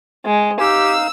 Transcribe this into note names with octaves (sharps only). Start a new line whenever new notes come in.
G#3
D#4 G4 F5 E6